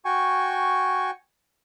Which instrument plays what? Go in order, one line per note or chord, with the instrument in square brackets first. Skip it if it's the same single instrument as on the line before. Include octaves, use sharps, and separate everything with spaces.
[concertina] F#4 G5 G#5 C#6